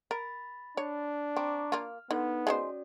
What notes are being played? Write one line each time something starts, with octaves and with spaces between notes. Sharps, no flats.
A#4 B5 A6
D4 C#5
C4 A#5 C#6 D6
A#3 F4 F6
D3 B3 D#4
G#3 C#4 F#4 G#4 C5 D5